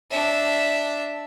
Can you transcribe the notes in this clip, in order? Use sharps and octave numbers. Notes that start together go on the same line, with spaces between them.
D4 E5